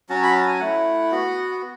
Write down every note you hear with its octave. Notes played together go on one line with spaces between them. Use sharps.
F#3 C#4 F#4 A5
B5
A5
G#5
A3 E4 F#5
B3 F#4